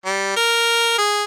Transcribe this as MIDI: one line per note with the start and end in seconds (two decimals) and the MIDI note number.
0.06 0.33 55
0.36 0.97 70
0.98 1.24 68